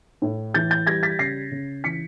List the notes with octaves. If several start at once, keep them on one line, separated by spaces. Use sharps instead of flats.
A2
E3 G6 A6
G6 A6
G3 G#6 A#6
A6 B6
C#3 A#6 C7
C#3
E3 B6 C#7